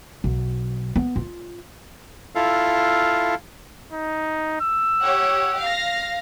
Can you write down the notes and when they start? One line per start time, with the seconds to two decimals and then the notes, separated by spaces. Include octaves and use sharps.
0.24 B1
0.96 B3
1.16 F4
2.35 E4 F4 A4 F5
3.92 D#4
4.61 E6
4.99 G4 C#5 F#5
5.59 F5 A#6